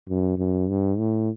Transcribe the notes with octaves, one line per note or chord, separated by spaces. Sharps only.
F#2
F#2
G2
A2